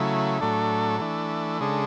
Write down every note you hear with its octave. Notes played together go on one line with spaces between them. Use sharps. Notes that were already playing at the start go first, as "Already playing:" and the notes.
Already playing: C#3 F#3 A3 E4
A2 F#3 A3 D4 A4
E3 A3 D4
C#3 G#3 D4 A4